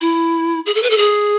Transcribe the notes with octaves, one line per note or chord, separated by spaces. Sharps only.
E4
G#4
A4
B4
A4
G#4